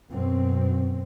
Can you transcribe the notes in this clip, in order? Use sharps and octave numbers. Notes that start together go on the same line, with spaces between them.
F#2 B2 C4